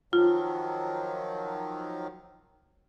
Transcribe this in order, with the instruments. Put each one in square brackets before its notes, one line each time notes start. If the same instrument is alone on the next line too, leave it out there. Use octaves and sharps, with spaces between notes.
[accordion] D#3 F3 F#3 [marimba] F4